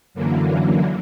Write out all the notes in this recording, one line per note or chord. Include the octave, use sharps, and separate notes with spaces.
F#2 D3 E3 F#3 A#3